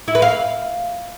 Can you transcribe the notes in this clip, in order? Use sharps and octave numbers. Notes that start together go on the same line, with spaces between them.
E4
B4
F5